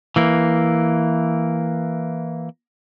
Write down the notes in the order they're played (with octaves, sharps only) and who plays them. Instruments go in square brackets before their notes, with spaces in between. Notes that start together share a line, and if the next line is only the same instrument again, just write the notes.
[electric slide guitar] E3 A#3